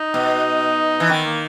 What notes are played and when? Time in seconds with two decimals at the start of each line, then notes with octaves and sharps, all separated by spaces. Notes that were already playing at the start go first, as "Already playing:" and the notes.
Already playing: D#4
0.14 B2
1.00 E3
1.09 D#3 B3
1.25 A#3